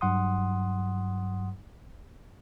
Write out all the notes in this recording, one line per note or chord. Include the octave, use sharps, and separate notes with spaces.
G2 F#3 F#5 C6 D#6